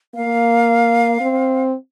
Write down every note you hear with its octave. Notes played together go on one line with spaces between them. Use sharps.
A#3 F5
C4